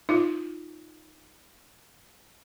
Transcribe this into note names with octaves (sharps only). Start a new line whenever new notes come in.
D#4 F4